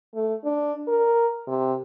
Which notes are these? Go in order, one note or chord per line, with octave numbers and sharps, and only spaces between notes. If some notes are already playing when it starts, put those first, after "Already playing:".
A3
D4
A#4
C3